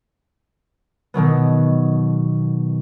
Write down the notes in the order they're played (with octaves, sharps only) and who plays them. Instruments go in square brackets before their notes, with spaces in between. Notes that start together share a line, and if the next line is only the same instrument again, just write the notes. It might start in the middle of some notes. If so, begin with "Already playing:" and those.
[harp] B2 D#3 F#3 B3